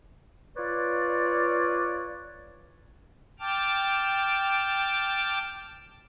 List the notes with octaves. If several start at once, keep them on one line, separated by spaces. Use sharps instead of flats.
F4 B4 C#5 D5
G5 A5 D6 F6